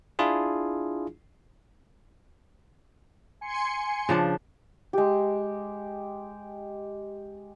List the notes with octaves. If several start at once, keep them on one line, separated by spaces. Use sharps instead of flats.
D4 E4 F4 G#4
G#5 C6 C#7
C#3 F3 D4
G#3 G4